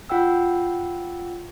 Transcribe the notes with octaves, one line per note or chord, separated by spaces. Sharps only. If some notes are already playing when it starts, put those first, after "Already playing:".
F4 F#5 G5 E6